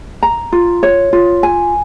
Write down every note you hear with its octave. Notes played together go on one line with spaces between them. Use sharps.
A#5
F4
C#5
F4
G#5